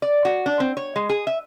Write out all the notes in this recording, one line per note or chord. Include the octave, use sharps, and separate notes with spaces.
D5
F#4
D4
C4
C#5
G#3
G#4
E5